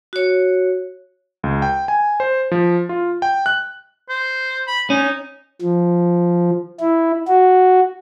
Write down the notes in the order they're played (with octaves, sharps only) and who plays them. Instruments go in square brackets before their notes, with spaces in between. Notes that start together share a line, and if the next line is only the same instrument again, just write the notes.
[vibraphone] F#4 C#5
[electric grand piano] C#2
G5
G#5
C5
F3
F4
G5
F#6
[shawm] C5
B5
[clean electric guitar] C#4 [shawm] D#4
[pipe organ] F3
E4
F#4